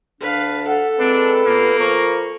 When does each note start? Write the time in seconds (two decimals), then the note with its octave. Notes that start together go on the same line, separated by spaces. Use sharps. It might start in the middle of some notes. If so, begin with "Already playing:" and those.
0.21 D2 D4 B4 F5
0.67 A4 F#5
0.99 A#2 G#3 C4 D4 B4
1.46 A#2 A#3 B3
1.80 F3 A#4 C#6